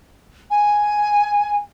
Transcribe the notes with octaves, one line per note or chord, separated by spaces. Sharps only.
G#5